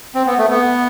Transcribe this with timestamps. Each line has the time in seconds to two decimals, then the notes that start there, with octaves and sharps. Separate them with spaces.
0.14 C4
0.26 B3
0.38 A3
0.50 B3